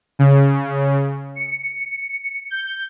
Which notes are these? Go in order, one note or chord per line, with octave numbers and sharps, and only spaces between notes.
C#3
C#7
G6